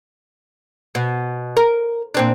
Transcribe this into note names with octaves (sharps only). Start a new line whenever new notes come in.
B2
A#4
A#2 C4 D4